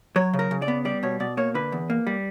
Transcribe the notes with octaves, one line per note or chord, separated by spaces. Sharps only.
F#3 C#5
C#3
A#4
C#3
D5
B3
G3 D5
B2 C#5
B2 D5
A#3 C#5
D3 B4
E2
A#3
G3